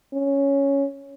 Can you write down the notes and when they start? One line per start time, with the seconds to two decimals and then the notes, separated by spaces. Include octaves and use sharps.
0.13 C#4